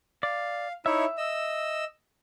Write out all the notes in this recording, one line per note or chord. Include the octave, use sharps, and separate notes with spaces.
D5 F5
D#4 E4 C#5 E5
D#5 E6